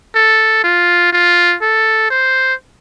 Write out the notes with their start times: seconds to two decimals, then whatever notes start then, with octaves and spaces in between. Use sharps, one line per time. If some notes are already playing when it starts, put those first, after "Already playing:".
0.15 A4
0.64 F4
1.13 F4
1.62 A4
2.10 C5